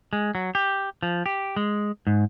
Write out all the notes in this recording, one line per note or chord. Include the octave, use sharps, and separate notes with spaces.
G#3
F#3
G4
F3
G4
G#3
G#2